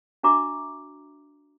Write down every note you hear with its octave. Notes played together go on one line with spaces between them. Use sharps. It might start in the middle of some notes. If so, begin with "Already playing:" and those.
D4 F#4 E5 A#5 C#6 D6